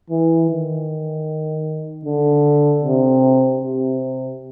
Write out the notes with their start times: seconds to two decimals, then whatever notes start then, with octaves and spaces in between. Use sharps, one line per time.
0.10 E3
0.50 D#3
2.05 D3
2.84 C3
3.61 C3